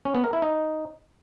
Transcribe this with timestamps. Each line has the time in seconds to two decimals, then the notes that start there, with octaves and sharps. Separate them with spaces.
0.05 C#4
0.15 B3
0.24 A#4
0.33 E4
0.42 D#4